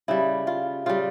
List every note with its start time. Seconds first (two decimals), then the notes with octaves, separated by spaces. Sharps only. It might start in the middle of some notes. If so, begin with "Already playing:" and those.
0.08 C#3 G3 E4
0.47 F4
0.86 C#3 G3 F4